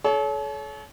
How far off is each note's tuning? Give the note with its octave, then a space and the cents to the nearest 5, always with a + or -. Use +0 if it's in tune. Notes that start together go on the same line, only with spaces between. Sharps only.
A4 -40 C#5 +25